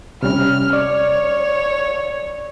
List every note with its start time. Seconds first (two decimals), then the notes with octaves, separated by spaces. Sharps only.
0.23 C3 G3 C#4 F6
0.73 C#5 D5